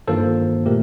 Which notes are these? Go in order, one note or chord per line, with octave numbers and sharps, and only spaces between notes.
G2 D#3 A#3 F4 A4 C5
A#2 A3 G4 A#4